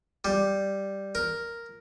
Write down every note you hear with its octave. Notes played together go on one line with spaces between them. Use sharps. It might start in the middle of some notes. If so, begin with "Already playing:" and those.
G3
A#4